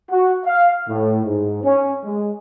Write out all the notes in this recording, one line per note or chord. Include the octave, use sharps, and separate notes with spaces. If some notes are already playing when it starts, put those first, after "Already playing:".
F#4
F5
A2
G#2
C#4
G#3